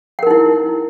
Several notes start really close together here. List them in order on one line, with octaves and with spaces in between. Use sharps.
F#5 A#4 D#4 E4